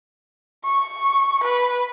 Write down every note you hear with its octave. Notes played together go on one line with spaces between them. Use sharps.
C#6
B4